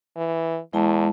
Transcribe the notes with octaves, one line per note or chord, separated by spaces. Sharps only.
E3
E2 G#3 E4 A5